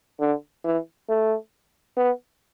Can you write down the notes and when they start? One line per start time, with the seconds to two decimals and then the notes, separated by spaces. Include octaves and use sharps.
0.19 D3
0.64 E3
1.08 A3
1.97 B3